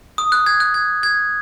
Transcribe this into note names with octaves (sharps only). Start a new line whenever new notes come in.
D#6
F#6
G#6
F#6
G#6
G#6